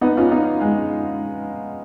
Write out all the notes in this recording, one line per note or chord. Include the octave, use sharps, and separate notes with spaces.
B3 D#4
C#4 F4
B3 D#4
G#3